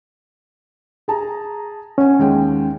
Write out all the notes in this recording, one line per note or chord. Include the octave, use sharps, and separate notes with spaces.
G#4 A5 A#5
C#4 F#5 G#5
D#2 G#3 G5